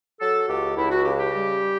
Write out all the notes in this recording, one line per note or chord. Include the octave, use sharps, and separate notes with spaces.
F#3 A4
C#2 G4
C#2 E4
F#4
C#3 G4
G4
G3